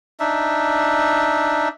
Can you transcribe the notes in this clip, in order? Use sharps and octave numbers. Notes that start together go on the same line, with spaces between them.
D4 D#4 E5